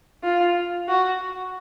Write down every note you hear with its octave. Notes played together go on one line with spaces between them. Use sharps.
F4
F#4